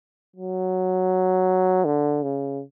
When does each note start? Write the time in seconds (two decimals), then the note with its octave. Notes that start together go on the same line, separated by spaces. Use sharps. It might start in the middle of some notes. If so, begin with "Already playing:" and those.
0.36 F#3
1.85 D3
2.23 C#3